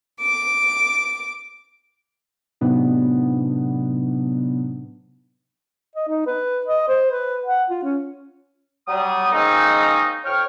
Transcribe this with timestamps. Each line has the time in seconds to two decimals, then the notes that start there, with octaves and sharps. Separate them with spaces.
0.19 D6
2.61 A2 C3 F#3 B3 D4 D#4
5.96 D#5
6.08 D#4
6.26 B4
6.66 D#5
6.88 C5
7.12 B4
7.46 F#5
7.70 F4
7.83 C#4
8.88 F#3 G3 D#6
9.32 G#3 A#3 C4 C#4 D#4
10.25 F2 C#5 G5 F6